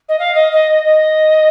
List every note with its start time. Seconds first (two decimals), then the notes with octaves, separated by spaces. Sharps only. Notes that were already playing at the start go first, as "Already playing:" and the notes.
0.09 D#5
0.19 F5
0.35 D#5
0.52 D#5
0.85 D#5